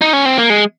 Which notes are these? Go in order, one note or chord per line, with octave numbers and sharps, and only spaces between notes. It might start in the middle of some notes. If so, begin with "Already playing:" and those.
D#4
C#4
C4
A#3
G#3